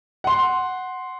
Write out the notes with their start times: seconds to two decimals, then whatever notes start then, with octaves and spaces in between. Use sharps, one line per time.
0.24 F#5 C6